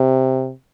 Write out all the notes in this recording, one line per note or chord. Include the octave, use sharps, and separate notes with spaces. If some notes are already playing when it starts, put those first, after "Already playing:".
Already playing: C3